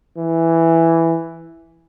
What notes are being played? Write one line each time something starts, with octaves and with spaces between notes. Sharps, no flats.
E3